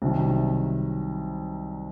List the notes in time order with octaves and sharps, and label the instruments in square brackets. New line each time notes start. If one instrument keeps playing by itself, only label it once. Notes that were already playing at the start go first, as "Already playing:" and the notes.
[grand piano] C2 C3 D#3 F#3